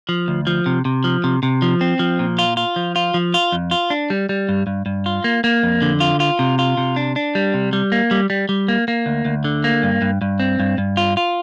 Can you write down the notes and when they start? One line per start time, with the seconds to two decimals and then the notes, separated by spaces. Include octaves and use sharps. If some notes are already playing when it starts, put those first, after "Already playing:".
0.09 F3
0.28 D2
0.47 F3
0.66 C3
0.85 C3
1.04 F3
1.24 C3
1.43 C3
1.62 F3
1.81 C4
1.99 F3
2.19 A#2
2.39 F4
2.57 F4
2.76 F3
2.96 F4
3.14 F3
3.34 F4
3.52 F2
3.71 F4
3.90 D4
4.10 G3
4.29 G3
4.49 G2
4.67 G2
4.86 G2
5.06 F4
5.24 A#3
5.44 A#3
5.63 F2
5.82 D3
6.00 F4
6.20 F4
6.39 C3
6.59 F4
6.78 C3
6.96 D4
7.16 D4
7.35 G3
7.54 C3
7.73 G3
7.92 A#3
8.11 G3
8.30 G3
8.49 G3
8.68 A#3
8.88 A#3
9.06 D2
9.25 D2
9.44 D3
9.64 A#3
9.83 G2
10.02 G2
10.22 G2
10.40 C4
10.59 G2
10.78 G2
10.97 F4
11.17 F4